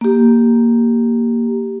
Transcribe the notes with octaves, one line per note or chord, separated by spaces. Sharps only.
A#3 G4